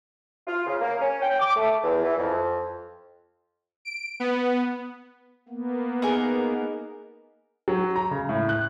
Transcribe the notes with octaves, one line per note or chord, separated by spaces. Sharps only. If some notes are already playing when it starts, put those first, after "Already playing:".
F4
C#3
A#3
C#4
G5
D6
A3
E2
E3
F2
D7
B3
A#3 B3
D#4 G#4 A#4
F#3
A#5
C#3
A2
F#6